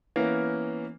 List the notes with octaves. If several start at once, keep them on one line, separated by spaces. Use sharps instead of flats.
E3 A#3 B3 C#4 A#4